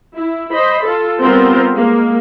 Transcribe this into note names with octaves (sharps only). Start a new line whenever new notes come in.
E4
C5 D#5 B5
F4 A4
G3 B3 C4 F4 A#4 C5
G#3 A#3